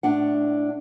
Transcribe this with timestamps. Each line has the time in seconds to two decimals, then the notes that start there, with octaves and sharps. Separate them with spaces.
0.03 A2 D4 F#5